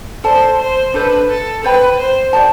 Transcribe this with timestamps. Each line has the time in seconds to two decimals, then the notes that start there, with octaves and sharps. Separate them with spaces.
0.24 A4 C5 D5 A5
0.59 C5
0.94 D4 A4 B4 C5
1.28 A4
1.63 A4 B4 C5 G5 B5
1.98 C5
2.33 G4 D5 A5